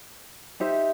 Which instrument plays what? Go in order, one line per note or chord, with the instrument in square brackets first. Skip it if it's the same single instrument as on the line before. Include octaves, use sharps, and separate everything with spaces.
[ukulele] D#4 G4 C5 E5